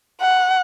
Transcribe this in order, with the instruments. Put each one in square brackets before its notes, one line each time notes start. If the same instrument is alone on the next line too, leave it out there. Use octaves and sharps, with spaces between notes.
[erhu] F#5